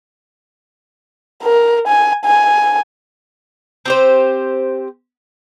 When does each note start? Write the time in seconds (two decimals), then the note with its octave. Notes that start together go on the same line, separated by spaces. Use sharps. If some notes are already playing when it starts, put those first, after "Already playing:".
1.44 A#4
1.88 G#5
2.25 G#5
3.86 C4 G4 C5